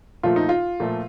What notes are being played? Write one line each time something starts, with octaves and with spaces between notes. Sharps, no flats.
A#2 F3 A3 F4
D#4
F4
A#2 F3 A3